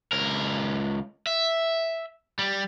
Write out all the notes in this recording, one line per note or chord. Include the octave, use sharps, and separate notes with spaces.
C#2 A#4
E5
G3